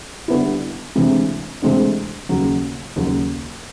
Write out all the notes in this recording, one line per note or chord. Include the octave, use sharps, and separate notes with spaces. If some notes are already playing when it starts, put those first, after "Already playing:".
D3 G3 B3 E4
D2 C3 E3 G#3 C4
D2 C3 E3 G#3 C4
D#2 C#3 F#3
D#2 C#3 F#3